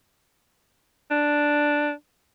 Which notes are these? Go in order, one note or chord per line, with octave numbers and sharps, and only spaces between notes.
D4